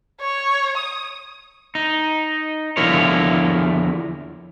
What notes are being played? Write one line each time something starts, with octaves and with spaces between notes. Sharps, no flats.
C#5
D#6
D#4
E2 D3 F3 E4 A#4 C#5